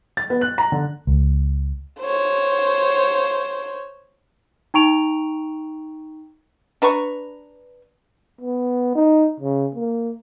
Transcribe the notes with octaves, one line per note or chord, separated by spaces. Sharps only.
A6
B3
F#6
A#5
D3
C#2
C5 C#5
D#4 G5 A#5 C#6 D7 F7
D4 B4 A#5 C#6
B3
D#4
C#3
A#3